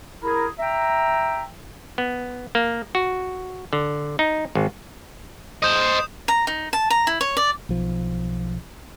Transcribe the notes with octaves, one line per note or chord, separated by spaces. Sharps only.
E4 G#4 A#4
E5 G5 A#5
B3
A#3
F#4
D3
D#4
G#1
C5 D#5 D#6 G6 E7
A#5
D#4
A5
A#5
E4
C#5
D5
B1 F3